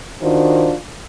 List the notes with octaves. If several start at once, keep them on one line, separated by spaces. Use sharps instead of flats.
D#3 D4 F4 F#4 C5